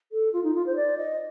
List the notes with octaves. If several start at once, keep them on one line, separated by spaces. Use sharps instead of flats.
A4
F4
D#4
F4
C5
D5
D#5